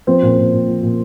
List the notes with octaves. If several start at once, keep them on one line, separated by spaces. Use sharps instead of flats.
F3 C4
A#2
A#2
A#2
F3
A#2